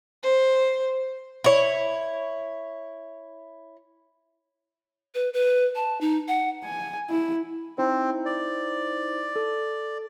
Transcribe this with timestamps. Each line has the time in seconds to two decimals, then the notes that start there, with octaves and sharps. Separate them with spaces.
0.23 C5
1.44 E4 C#5
5.15 B4
5.34 B4
5.75 A5
6.01 D#4
6.28 F#5
6.65 G#5
7.09 E4
7.78 C4 D#4 E4 C5
8.25 D5
9.36 A4